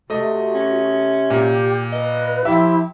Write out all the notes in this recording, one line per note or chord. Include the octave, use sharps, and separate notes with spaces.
C3 A3 F#4 D#5
C#4
A#2 G4
B4 D#5
F3 E4 G4 E5